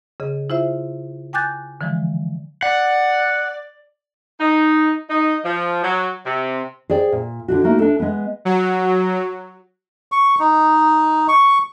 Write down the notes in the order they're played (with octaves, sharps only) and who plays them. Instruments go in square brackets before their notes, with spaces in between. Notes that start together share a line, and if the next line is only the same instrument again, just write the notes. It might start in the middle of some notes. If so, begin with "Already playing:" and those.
[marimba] C#3 G#4 D#5
E4 F4 C5 E5
G5 G#5 D6 F#6 G6 A6
D3 E3 F3 G#3
[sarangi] D5 [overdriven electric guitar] F#5
[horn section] D#4
D#4
F3
F#3
C3
[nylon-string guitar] G#4 C5 D5 G5
A#2
D3 D4 F#4
A3 A#3 D#4 F#4
D4 A4
G#3 B3
[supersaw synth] F#3
[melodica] C#6
D#4
C#6